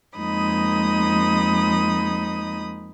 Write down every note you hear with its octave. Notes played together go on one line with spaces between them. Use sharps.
F2 G#3 A#3 D#4 B5 D#6